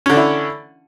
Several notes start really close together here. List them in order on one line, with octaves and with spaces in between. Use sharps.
C#4 D3 D4 E4